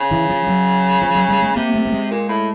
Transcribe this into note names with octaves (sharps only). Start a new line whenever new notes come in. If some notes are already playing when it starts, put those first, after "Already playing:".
Already playing: C#3
E3
F3
F#3
F3
F#3
G3
G#3
C3 A#3
A3
A3
G#3
A#2
A2